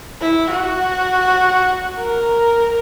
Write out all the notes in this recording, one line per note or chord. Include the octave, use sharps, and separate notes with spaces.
E4
F#4
A#4